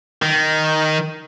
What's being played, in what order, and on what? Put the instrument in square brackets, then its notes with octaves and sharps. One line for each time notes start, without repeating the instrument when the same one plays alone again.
[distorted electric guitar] D#3